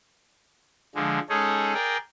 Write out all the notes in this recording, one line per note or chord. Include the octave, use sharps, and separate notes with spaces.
D3 F3 G#3
G#3 C#4 D#4 G#4 A4
G#4 A#4 D5 G5